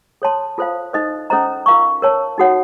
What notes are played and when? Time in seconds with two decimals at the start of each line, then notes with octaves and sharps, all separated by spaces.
0.22 A4 C#5 A5 C6
0.58 F4 A4 C5 F5
0.93 D#4 A4 C5 D#5
1.30 C#4 A4 C5 D#5 A#5
1.66 F4 A#4 F5 A#5 C#6
2.02 A#4 C#5 A5
2.38 D#4 F#4 A4 C#5 F#5